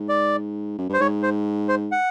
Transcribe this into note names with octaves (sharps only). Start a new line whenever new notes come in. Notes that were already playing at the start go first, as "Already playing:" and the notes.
Already playing: G#2
D5
F#2
G2 C5
G#2 C#5
C5
C5
F#5